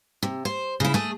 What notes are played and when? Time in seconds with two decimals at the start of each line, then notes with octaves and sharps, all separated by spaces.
0.23 C3
0.45 C5
0.80 C#3 E4
0.94 A3 G#4